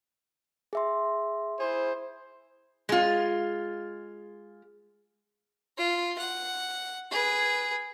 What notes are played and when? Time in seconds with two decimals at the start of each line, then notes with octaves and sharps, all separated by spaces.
0.73 G#4 E5 C6
1.60 E4 G#4 C5
2.89 G#3 F4
5.77 F4
6.18 F#5
7.11 G#4 B4